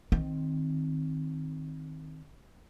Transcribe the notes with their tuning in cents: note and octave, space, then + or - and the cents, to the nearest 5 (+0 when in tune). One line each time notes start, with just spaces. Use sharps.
D#3 +0 C4 +0